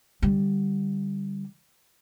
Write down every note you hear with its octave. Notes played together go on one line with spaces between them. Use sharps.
D3 G3